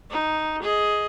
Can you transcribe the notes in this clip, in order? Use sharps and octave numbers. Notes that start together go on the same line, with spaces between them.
D#4
G#4 D#5